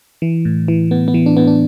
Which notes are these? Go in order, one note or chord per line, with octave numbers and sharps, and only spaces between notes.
E3
A2
E3
A2 B3
B3
E3
D4
A2 B3
D4